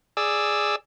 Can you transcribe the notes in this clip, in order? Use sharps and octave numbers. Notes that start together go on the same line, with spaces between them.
G#4 D5 E6